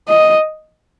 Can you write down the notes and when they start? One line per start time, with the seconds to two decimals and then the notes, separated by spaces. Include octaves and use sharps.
0.09 D#5